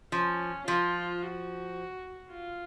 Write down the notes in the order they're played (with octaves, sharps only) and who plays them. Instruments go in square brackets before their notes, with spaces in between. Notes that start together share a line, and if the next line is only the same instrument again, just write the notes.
[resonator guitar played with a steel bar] F3 [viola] C#4
[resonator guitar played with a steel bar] F3 [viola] F4
[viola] F#4
F4